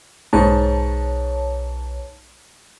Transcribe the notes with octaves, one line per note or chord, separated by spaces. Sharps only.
B1 G#2 C#5 A5